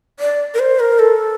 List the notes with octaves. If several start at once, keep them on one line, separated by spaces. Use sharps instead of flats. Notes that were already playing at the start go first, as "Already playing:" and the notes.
D5
A#4
C5
A#4
A4